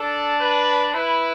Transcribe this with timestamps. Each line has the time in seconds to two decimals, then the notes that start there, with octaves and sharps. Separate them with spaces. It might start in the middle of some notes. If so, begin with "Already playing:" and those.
Already playing: D4 A4
0.41 B4
0.94 E4 B4